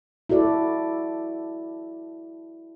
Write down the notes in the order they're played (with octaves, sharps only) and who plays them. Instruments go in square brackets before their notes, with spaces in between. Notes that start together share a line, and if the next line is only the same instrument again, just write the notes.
[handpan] E4 F#4 A4 D5